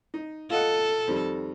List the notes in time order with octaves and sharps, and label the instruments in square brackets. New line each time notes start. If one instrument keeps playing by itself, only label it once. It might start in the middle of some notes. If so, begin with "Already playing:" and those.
[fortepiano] D#4
[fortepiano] F4 D#5 F#5 [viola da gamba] A4
[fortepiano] F2 D#3 G3